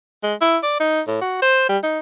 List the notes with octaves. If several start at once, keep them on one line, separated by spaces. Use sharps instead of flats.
G#3
E4
D5
D#4
A2
F#4
C5
G3
D#4